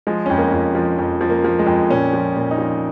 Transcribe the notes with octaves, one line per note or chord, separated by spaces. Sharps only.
F3 G#3
F2 C#4
A#3
F2
F3
F2
F3
A#3
F3
G#3
F2
A#2 C#4
F3
A#2
D#4
F3